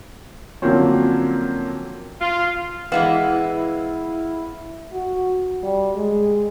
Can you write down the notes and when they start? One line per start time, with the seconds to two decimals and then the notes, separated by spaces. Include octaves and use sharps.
0.62 D3 F3 F#3 A#3 C4 C#4
2.21 F4
2.92 E3 G#3 B3 E4 F5
4.93 F#4
5.63 G3
5.96 G#3